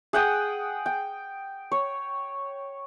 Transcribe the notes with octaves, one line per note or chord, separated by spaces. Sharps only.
G#4 F#5 G5 D#6
G5
C#5